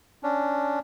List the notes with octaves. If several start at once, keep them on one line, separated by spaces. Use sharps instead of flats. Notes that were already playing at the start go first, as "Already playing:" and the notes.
C#4 D4